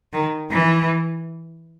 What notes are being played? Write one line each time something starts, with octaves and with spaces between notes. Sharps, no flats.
D#3
E3